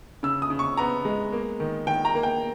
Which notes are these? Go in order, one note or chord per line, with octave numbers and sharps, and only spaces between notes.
C#3 E6
D#6
C#3
C#6
B3 A#5
G#3
A#3
D#3
D#3 G5
A#5
A#3
G5